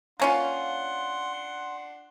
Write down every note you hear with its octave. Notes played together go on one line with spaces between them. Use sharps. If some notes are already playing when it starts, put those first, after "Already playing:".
A#3 C#4 D4 F4 F#5 C6